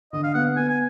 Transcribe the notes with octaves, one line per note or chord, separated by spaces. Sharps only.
D3 D#5
F5
B3 F#5
B3 G#5
G#5